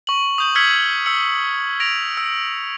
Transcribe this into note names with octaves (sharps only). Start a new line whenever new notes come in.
C#6 F#7
D#6 G6 F#7
E6 F6 G#6 B6 C#7 F#7
E6 C#7 F#7
A#6 D7 F7
E6